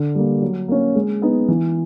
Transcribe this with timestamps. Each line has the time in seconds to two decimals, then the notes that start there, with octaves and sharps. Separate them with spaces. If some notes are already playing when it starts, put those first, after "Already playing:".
Already playing: D3
0.15 G3 A#3
0.42 F#3
0.68 A#3 C#4
0.95 G#3
1.22 B3 D#4
1.48 E3